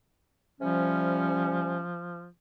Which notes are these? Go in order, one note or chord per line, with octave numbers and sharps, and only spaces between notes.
C3 F3 G3 C#4